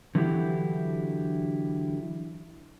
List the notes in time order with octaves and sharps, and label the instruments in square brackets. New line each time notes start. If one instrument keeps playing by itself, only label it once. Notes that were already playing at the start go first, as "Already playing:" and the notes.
[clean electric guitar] D3 E3 F#3 D4 E4 G4